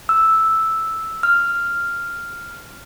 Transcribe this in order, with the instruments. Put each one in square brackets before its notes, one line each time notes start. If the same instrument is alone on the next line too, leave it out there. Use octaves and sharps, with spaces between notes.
[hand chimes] E6
F6